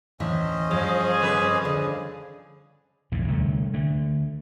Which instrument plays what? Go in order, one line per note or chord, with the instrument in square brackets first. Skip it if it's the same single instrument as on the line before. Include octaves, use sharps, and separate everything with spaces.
[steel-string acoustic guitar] D2 A2 E3 [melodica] C#4 C5 D#5
[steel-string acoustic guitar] G2 [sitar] F3 [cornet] G#4
[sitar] F2 C#3 B4
[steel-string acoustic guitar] D3 [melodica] D5
[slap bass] A#1 E2 A2 C3
C2 D3 E3 A3
D3 A3